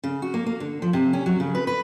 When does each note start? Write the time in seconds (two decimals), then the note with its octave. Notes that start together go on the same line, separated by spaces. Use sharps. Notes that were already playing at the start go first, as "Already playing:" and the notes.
0.04 C#3
0.22 F#4
0.34 A#3
0.46 A#3
0.60 D3
0.82 F3
0.93 C3
1.13 C#4
1.26 F#3
1.40 C#3
1.55 B4
1.67 B4